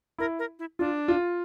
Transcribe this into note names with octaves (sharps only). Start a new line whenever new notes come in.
E4 A#4
A#4
E4
D4 F4
F4